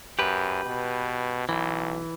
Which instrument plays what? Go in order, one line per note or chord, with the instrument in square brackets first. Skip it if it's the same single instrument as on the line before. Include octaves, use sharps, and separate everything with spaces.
[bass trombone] F#2 [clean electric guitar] G4 B4
[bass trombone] B2
[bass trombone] B1 [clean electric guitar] E3